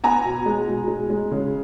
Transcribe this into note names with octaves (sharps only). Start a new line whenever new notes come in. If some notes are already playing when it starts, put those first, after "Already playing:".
B3 G#5 A#5
B2
G#3
B2
G#3
G#3
C#3